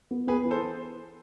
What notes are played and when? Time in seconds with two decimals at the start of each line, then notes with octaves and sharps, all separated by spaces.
0.11 B3
0.27 B3 G#4 B4
0.45 E3
0.51 A4 C5